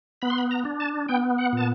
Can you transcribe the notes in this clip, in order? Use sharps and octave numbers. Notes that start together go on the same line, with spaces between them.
B3 B5
C6
B5
A#5
D4
A5
B3 G5
F#5
A#2 A5